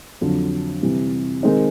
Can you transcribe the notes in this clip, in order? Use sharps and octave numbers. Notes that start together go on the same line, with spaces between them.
F2 D3 F#3
C3 E3 G3
D#3 G#3 C4 D#4